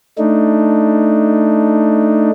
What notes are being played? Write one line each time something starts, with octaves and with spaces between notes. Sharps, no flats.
A3 D4 D#4